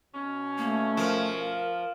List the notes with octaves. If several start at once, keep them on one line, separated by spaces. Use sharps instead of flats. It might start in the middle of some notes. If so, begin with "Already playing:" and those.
B2 C#4
A3 A#3
F3 A#4